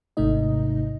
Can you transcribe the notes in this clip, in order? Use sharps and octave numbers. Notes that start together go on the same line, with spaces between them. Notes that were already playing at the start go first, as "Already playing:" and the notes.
G#1 G#2 C3 A3 D#4 D#5